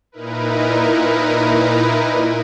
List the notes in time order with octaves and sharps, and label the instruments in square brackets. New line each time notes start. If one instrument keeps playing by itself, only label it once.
[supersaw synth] A#2 D#4 E4 A#4 B4